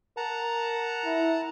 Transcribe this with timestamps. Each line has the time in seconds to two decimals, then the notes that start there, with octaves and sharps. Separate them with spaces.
0.17 A#4 F#5 A5 A#5
1.05 E4